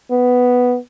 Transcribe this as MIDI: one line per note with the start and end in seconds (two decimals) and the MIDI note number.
0.10 0.77 59